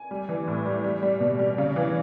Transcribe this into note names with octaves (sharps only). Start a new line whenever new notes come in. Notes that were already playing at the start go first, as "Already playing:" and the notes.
Already playing: G#5
G3
E3
A2
G3
G3
G3
B2
G3
C#3
E3